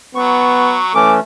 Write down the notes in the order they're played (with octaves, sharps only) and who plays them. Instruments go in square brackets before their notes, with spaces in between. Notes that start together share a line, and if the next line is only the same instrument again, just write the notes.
[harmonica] F#3 [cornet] B3 [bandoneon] C#6
[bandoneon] E3 C#4 [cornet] A3 [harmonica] D6